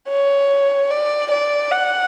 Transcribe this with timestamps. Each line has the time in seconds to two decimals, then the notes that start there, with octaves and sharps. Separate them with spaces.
0.09 C#5
0.90 D5
1.31 D5
1.72 F#5